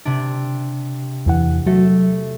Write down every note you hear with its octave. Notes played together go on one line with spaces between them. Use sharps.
C3 D4
E2 E3 F#5
F#3 A3